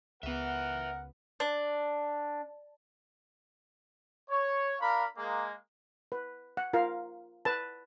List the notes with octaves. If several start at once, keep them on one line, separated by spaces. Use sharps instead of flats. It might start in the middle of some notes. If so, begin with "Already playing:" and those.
C#2 B3 A#4 B4 E5 F#5
D4
C#5
D4 A#4 F5 B5
G#3 A#3
B4
F#5
F4 A#4 F5
B4 A5